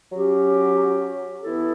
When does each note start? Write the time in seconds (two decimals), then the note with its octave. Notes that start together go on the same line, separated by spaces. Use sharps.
0.12 F#3 C#4 G4
1.41 E3 B3 E4 A4